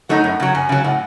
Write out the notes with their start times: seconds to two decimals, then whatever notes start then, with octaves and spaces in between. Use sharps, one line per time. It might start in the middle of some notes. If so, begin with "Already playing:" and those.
0.09 F#3 A3 D#4 F#5
0.24 F#2
0.40 C#3 F#3
0.55 F#2 G#5
0.69 C#3 F#3
0.84 A2 F#5